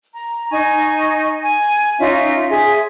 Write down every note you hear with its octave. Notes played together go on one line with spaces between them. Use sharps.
A#5
D#4 G#5 C#6
G#5
C#4 D#4 F4 E5
G#4 E5 G#5 C6